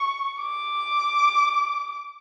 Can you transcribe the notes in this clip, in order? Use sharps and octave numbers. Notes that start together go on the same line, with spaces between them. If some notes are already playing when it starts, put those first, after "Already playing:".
Already playing: C#6
D6